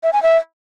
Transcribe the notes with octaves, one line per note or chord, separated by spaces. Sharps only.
E5
G#5
E5